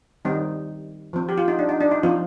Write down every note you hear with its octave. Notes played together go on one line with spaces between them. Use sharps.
D#3 G3 C4 D#4
F3 C4
G4
F4
D#4
D4
D#4
D4
D#4
F3 C4 F4